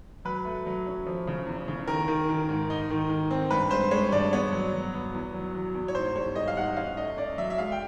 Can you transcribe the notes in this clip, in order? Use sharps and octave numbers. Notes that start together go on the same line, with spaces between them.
F#3 B4
A3
F#3
C#4
F3
C#3
E2
C#3
D#3 A#4
D#3
D#3
G#2
D#4
D#3
D#3
C4
G2 B4
G#3 C5
G#3 C#5
G2 D5
B3 C#5
F#3
F#3
B3
E2
F#3
F#3
E2
C#5
G#2 C5
G3 C#5
G3 D#5
F5
G#2 F#5
C#4 F5
A3 D#5
C#4 D5
F#3 E5
E5
G#3 F5
G5